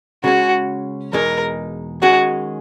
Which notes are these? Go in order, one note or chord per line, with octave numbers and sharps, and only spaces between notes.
C#3 G#3 C#4 F#4
E2 B2 G#3 D#4 A#4
D#3 G#3 C#4 F#4 G#4